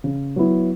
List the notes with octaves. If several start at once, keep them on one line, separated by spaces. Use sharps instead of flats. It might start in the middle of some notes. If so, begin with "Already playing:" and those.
C#3
F#3 B3 E4